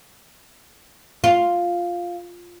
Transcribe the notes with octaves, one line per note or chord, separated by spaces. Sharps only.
F4